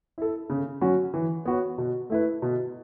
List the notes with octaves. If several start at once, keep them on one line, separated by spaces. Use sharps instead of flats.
E4 A4
C#3
F#3 C#4 F#4 C#5
E3
B3 F#4 C#5
B2
A3 E4 B4
B2